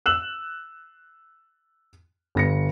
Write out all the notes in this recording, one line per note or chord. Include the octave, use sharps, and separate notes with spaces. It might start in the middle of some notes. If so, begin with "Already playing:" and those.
E6 F#6 E7 F#7
G1 A#6 C#7